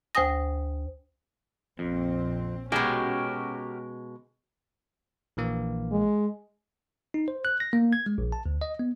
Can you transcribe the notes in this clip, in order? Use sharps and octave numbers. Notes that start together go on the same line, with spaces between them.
D2 C5 G5 G#5 D#6 A#6
A#1 F2 C4
B2 G#3 C#4 F#4 G4 A#4
A#1 E3 A#3
G#3
D#4
C5
F#6
A#6
A#3
G#6
G#3
A#1
A5
D2
D#5
B3